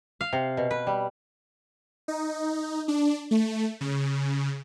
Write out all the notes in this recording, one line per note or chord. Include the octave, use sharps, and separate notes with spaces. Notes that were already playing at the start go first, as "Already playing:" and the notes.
F5
C3
B2
B4
G3
D#4
D4
A3
C#3